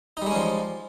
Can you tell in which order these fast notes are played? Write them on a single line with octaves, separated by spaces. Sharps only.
D#4 G3 G#3 C#4 F3